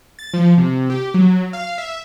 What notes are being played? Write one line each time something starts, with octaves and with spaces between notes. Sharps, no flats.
A6
F3
C3
G4
F#3
F5
E5